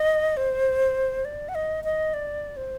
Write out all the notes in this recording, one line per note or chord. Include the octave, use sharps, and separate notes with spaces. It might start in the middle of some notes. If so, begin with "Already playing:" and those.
Already playing: D#5
C5
D5
F#5
D#5
D#5
D5
C5